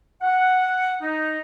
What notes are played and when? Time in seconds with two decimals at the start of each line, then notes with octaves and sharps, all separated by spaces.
0.21 F#5
1.01 D#4